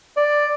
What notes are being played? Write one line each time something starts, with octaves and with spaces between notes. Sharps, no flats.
D5